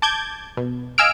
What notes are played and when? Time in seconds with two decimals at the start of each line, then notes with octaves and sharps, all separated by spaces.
0.02 A5 D6 G6 G#6
0.57 B2
0.98 D#5 F5 G#5 E6 F6 D7